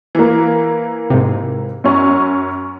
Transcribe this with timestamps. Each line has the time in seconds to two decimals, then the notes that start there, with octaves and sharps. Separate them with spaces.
0.15 E3 A#3
1.10 G#2 C3
1.84 F#2 C#4